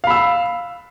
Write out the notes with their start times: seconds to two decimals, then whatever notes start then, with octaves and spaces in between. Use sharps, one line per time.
0.04 F5
0.07 B5
0.10 E6